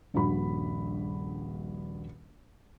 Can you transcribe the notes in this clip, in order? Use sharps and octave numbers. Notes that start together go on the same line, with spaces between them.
D#1 A#1 G2 F#4 B5